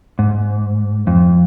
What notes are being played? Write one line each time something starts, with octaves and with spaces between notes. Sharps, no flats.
G#2
F2